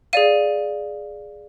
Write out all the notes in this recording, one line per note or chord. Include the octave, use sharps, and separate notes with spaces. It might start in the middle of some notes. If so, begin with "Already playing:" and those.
G#4 D5 F5 D#7